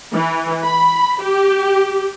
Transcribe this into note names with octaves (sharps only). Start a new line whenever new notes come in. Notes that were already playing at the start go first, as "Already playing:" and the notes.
E3
B5
G4